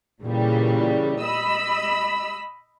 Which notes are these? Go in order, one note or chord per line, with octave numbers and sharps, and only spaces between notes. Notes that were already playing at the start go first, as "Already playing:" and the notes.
A#2 C#3 E3 G3
D#5 B5 E6